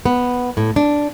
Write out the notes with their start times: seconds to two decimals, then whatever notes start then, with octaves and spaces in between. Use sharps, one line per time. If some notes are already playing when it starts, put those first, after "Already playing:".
0.06 B3
0.57 A2
0.76 D4